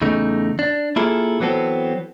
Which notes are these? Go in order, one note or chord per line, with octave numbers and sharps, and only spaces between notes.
E2 C#3 A3 D#4
D4
A#3 E4 F4 G#4 A4
E3 F#3 B3 C4 A4